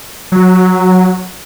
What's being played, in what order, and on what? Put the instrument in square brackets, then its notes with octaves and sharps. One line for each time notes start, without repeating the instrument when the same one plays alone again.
[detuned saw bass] F#3